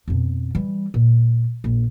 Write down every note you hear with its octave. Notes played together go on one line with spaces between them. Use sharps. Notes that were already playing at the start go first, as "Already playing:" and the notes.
F2 B2
E3 G3
A#2
A#1